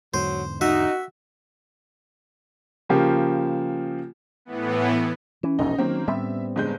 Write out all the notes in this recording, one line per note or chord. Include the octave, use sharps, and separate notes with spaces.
E2 G#2 D3 F#3 C5
D#4 F#4 E5
C#3 F3 A#3 G4
A2 E3 B3
E3 C#4
E1 A#1 F2 D#4
D#3 F#3 A#3 C4
A2 G3 B3 C4 E5
G1 G#3 G6